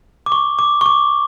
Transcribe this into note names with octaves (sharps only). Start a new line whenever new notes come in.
D6
C#6
D6
C#6
D6